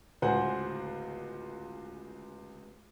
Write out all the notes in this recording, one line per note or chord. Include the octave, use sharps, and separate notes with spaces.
D1 C#2 C5 F#5 G#5